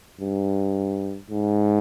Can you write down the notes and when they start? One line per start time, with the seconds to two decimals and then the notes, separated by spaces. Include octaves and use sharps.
0.21 G2
1.30 G#2